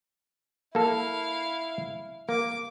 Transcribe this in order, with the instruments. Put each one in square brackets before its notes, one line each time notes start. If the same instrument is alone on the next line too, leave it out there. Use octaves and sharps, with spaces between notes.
[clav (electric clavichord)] A#3 A4 [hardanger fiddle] E4 F5
[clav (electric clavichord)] A#3 [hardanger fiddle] D6